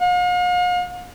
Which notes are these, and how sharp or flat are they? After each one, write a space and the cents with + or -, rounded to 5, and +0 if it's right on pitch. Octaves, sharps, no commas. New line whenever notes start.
F5 +45